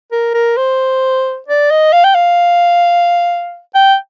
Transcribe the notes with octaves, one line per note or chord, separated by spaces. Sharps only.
A#4
A#4
C5
D5
D#5
F5
G5
F5
G5